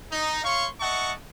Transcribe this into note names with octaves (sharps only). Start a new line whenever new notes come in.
D#4
C#5 F5 C6 C#6
D#5 E5 F#5 A5 C#6